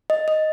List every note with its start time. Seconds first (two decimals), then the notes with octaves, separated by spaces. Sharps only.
0.10 D#5
0.28 D#5